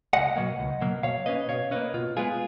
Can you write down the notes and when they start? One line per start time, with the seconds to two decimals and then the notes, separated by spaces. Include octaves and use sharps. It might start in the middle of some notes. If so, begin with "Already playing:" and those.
0.13 C#2 D#5 F#5
0.36 B2 F#3 A#3
0.59 C#2
0.81 B2 F#3 A#3
1.03 B2 C#5 F5
1.26 A#3 C#4 B4 D#5
1.49 B2 C#5 F5
1.71 A#3 C#4 B4 D#5
1.94 B2 F4
2.17 G#3 B3 F4 G#4